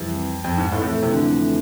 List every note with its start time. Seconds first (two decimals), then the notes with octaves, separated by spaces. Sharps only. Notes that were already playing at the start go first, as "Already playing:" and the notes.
Already playing: C2 F2 C3 E3
0.44 F2
0.58 G#2
0.72 F2 A2 E3 A3
0.82 A2
1.03 C3
1.12 D3